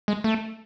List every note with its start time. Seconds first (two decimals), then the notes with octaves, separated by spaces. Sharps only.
0.08 G#3
0.24 A3